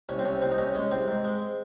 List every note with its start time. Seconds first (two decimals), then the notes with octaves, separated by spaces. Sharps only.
0.09 C2 C#4
0.19 C4
0.25 C2 C#4
0.42 C2 C4
0.52 D#4
0.58 C2 C#4
0.75 G#3 C#4
0.91 C2 C4
1.08 G#2
1.25 G#3